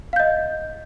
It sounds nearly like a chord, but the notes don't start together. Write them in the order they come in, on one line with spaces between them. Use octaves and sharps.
F5 G6 D#5